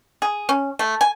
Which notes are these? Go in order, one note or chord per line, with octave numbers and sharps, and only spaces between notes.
G#4
C#4
A3
G#5